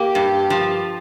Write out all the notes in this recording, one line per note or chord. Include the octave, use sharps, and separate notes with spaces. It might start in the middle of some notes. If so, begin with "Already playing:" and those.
Already playing: A#3 G4
G2
F3